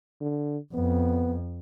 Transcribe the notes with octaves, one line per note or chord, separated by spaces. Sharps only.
D3
F2 B3